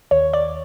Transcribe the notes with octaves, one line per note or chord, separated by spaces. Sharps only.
D#2 C#5
D5